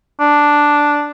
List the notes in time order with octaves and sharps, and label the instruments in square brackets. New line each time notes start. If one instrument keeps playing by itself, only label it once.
[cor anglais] D4